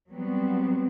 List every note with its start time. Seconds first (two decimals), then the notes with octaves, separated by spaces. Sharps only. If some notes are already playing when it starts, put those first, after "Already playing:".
0.10 F#3 G3 B3 C4